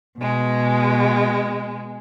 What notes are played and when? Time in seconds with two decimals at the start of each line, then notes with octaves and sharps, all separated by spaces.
0.18 B2 G#3